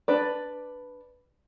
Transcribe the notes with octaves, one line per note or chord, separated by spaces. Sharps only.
D4 B4 D5